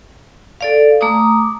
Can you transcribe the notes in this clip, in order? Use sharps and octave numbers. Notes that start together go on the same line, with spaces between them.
A4 D5 F5
A3 A#5 D6 D#6